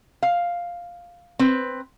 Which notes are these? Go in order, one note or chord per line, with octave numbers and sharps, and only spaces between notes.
F5
C4 B4